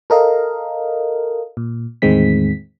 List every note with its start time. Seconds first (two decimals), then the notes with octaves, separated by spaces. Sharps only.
0.10 A4 A#4 D#5 F5
1.57 A#2
2.02 E2 A2 D#3 G#3 C4 B6